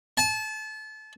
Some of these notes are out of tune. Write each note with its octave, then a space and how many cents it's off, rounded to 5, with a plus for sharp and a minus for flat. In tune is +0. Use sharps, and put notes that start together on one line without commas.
A5 -30